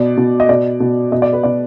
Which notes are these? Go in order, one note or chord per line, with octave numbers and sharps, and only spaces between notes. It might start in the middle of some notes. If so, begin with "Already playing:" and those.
Already playing: B2 D5
B2
D#5
B2 D5
B2
B2 D#5
D5
B4
B2 D5